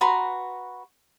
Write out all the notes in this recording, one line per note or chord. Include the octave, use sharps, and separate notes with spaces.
F#4 B4 A#5 C6